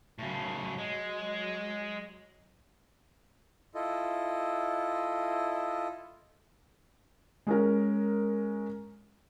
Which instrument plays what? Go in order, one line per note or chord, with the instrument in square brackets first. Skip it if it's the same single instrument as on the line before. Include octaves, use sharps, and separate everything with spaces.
[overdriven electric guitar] A2 C#3 [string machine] F#3
[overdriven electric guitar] G#3
[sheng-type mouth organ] E4 F4 A4 D#5
[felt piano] G#3 C#4 A#4